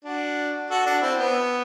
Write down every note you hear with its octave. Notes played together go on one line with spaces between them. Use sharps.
D4 F#4
F#4 A4
D4 F#4
C4 E4
B3